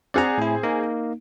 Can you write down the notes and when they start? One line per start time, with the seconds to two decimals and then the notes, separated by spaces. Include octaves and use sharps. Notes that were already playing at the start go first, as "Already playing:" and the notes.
0.14 C4 G#4 D5 F#5 A#5
0.38 A2 E4
0.63 A#3 D#4